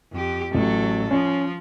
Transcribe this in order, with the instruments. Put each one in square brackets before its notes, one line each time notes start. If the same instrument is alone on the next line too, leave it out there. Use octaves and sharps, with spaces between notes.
[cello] F2 G4
[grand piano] A1 [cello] F#3 A4
[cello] F3 [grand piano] C#4